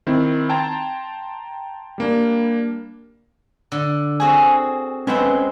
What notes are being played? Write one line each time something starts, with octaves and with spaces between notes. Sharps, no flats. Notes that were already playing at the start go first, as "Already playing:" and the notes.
D#3 C4 E4
G5 A5 A#5 C6 G#6 A6
G3 A#3 D4
D3
C4 F#4 G#4 G#5
G#3 C4 C#4 B4 C5 F#5